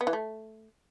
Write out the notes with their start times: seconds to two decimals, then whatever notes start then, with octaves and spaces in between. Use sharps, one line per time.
0.01 B3
0.07 E3
0.13 A3